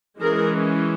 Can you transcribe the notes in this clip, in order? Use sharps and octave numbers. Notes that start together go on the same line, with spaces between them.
E3 G#3 C#4 G#4 A#4